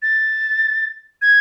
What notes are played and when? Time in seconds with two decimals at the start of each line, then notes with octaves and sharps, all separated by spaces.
0.02 A6
1.22 G#6